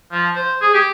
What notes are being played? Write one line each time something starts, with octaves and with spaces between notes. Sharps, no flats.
F3
C5
G#4
G4